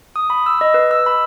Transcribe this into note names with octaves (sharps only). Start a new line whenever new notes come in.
D#6
B5
E6
D#5
B4
E6
B5